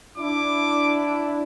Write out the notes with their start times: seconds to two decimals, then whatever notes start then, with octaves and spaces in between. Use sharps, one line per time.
0.18 D4 E4 D6